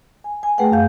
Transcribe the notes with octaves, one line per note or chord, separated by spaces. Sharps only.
G#5
G#5
A3 G#4 B4 F#5 G5
F#2 F5 G6